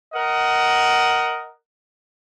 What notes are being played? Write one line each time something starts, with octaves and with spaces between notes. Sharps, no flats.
A#4 D#5 F#5